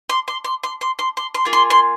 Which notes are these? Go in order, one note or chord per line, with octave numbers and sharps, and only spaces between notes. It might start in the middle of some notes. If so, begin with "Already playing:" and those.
C6
C6
C6
C6
C6
C6
C6
C6
A#3 F4 G#4
C6
C6